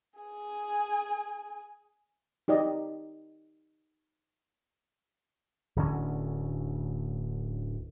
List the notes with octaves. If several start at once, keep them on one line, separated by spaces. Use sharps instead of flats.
G#4 G#5
D#4 G4 D5 D#5
D1 D2 D3 C#4